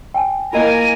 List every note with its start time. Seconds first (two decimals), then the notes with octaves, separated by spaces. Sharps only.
0.14 G5 G#5
0.53 A#3 E4 F4 A#4 D#5 G#5